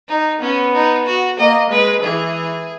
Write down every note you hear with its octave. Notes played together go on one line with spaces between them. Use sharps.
D#4
B3 C#4
D#4
F#4
A#3 D#5
G#3 B4
E3 G#4